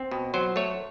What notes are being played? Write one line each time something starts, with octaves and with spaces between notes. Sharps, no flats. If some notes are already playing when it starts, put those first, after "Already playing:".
Already playing: C4
B2
F#3 C5
A3 C#5